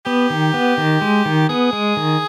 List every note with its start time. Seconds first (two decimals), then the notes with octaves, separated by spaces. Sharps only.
0.06 B3 G4
0.30 D#3
0.54 B3
0.78 D#3
1.01 G#3
1.25 D#3
1.49 B3 G#4
1.73 G#3
1.97 D#3